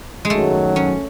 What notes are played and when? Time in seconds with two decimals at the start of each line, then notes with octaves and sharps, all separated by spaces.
0.25 G#3
0.30 F#2 D#3 F#3 A3
0.76 C#4